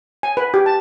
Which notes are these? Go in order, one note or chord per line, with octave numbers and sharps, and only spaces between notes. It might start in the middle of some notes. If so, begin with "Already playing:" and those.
G#5
B4
G4
A5